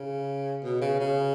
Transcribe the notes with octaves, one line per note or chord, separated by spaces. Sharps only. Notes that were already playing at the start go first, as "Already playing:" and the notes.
Already playing: C#3
B2
C#3
C#3